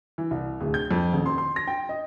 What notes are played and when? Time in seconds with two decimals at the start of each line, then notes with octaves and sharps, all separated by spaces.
0.18 E3
0.31 C2
0.61 D1
0.74 G6
0.91 F2
1.13 D#1
1.26 C6
1.38 C6
1.56 A#6
1.67 G5
1.89 D#5